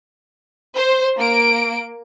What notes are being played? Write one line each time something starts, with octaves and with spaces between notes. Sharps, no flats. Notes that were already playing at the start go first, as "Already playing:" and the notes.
C5
A#3 D7